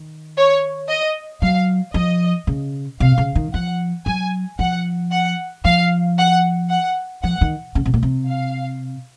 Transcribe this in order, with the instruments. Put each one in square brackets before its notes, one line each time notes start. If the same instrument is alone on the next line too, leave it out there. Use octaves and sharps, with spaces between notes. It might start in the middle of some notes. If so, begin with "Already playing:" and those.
Already playing: [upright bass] D#3
[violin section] C#5
D#5
[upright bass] F#3 [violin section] F5
[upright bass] F3 [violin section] D#5
[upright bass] C#3
[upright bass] C3 [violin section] F5
[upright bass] C#3
D#3
[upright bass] F3 [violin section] F#5
[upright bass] F#3 [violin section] G#5
[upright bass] F3 [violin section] F#5
[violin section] F#5
[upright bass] F3 [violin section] F5
[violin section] F#5
F#5
[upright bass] F3 [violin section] F#5
[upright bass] D#3
C#3
C3
A#2
C3
[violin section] F5